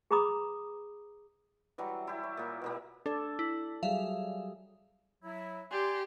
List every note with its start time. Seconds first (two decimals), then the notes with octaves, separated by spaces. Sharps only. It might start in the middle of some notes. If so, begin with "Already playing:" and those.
0.11 G#4 B4 A#5 B5 D6 D#6
1.78 E3 F#3 G3
2.07 E4 G4
2.23 C#5
2.37 A#2 A#3
2.62 B2 G3 A#3
3.06 D4 A4 D5
3.39 E4
3.83 F#3 G3 G#4 E5 F5
5.23 F#3 E4
5.71 G4 D5 G#5 C6